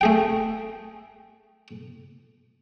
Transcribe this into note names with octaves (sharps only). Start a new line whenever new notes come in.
A3 G#4 G5